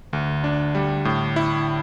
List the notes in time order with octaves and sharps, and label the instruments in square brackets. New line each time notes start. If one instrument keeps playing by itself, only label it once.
[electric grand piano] D2 [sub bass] D3
[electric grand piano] D4
G3
A2
E4